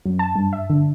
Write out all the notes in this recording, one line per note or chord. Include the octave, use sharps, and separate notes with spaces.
F#2
A5
G2
E5
D3